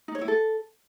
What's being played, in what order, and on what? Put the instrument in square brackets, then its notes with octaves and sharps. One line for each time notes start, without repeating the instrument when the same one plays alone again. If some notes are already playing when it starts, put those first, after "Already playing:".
[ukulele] D#4
C#5
E4
A4